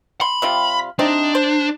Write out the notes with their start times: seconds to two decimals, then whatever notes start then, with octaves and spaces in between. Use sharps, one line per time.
0.21 B5 C6
0.42 C3 G3 F4
0.99 C3 C4 D4 D#4
1.35 C5